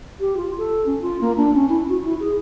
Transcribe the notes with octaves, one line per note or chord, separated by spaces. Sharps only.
G4
F4
A4
C#4
F4
A#3
D4
C#4
E4
F#4
E4
G#4